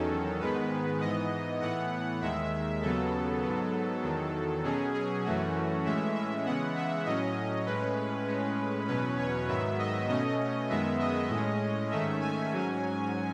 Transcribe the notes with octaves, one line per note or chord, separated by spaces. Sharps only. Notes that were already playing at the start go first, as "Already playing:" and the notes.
Already playing: E2 D#3 F#3 C#4 A4
G#2 D#3 G#3 B3 B4
G#2 E3 B3 D#5
A2 E3 B3 F#5
D#2 D#3 G#3 E5
D#2 C#3 F#3 B3 A4
G#2 F#3 B3
E2 D#3 F#3
B2 F#3 C#4 G#4
G#4
F#2 E3 A3 C#4 F#4
A2 E3 G#3 C#4 E5
E5
C#3 E3 G#3 B3 F#5
E5
A2 F#3 C#4 D#5
A2 G#3 C#4 B4
A2 G#3 C#4
E2 B2 F#3 C#4 B4
C#5
G#2 D#3 F#3 B3 E5
D#5
B2 A3 C#4 D#5
F#2 D#3 G#3 B3 E5
D#5
A2 G#3 C#4
G#2 D#3 A3 C#4 E5
G#5
G#2 F#3 C#4